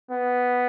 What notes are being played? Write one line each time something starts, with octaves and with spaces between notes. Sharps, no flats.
B3